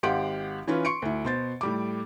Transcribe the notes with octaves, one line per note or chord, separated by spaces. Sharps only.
G#1 G4 F5 F#5 C6 D7
E3 C#4 F4 B4
C6 C#6 C#7 D7
D2 E4
B2 C5 A6
A2 G3 D6